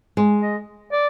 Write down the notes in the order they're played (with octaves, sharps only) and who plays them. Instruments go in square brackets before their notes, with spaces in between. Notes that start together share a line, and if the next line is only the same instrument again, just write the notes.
[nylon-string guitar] G#3
[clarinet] D#5
D5